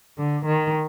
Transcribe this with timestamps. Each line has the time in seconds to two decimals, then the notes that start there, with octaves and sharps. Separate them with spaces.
0.18 D3
0.46 D#3